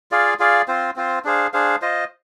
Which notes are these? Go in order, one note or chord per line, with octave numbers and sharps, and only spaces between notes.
F4 G#4 D5 F5
F4 G#4 D5 F5
C4 F4 C5
C4 F4 C5
D4 G#4 C5 F5
D4 G#4 C5 F5
F4 C5 D#5